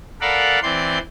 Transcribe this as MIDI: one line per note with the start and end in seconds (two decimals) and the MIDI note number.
0.21 0.59 69
0.21 0.59 70
0.21 0.59 74
0.21 0.59 77
0.21 0.59 78
0.21 0.59 83
0.63 0.98 52
0.63 0.98 60
0.63 0.98 74
0.63 0.98 84
0.63 0.98 91